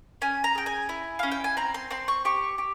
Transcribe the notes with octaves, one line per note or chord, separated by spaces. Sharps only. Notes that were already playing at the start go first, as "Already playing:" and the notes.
C#4 G#5
A#5
G#4 G5
G#5
E4
C#4 F5
G5
G#5
C4 A#5
C6
C4 C6
C#6
G4 C#6
G4